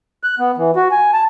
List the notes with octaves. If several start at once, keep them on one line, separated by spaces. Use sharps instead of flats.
F#6
B3
E3
F#4
G#5
A5